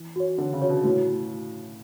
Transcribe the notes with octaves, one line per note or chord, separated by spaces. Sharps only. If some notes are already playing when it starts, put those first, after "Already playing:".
Already playing: E3
F#4 C#5
D3 D4
C#3
F#4 C#5
B2
A2 F#4